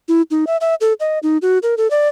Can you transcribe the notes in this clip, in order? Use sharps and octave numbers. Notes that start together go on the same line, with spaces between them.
E4
D#4
E5
E5
A4
D#5
D#4
F#4
A#4
A4
D5